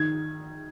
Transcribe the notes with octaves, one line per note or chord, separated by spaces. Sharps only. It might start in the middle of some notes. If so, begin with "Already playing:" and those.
Already playing: D#3 G#6